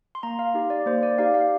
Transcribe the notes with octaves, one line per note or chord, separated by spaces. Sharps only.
C6
A#3 A#5
F5
D#4 G4
D5
A#3 C5
D5
D#4 G4 F5
F5